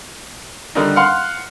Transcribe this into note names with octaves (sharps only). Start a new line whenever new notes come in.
D3 D#3 G3 D#4
F5 F#5 C6 F6